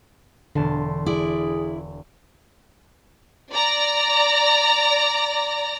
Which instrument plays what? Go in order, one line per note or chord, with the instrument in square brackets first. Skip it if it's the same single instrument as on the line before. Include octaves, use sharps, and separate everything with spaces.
[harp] E1 A5 C6 [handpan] D3
[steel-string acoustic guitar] E4 D5 [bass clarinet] G#4
[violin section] D5 A#5